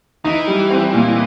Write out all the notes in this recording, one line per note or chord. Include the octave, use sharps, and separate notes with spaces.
E3 D#4
G3
C4
A#2